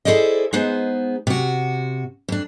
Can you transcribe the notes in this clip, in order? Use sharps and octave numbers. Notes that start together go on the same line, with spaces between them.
E4 G#4 A4 C5 D5 D#5
G#3 B3 D#4 G#4 C5
C3 F#4
F2 D4